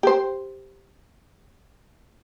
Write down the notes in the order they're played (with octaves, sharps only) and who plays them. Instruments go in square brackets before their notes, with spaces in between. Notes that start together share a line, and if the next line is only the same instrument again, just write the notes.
[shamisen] G4 C5